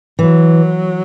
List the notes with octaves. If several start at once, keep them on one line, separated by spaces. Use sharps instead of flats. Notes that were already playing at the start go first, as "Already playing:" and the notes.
E3 F#3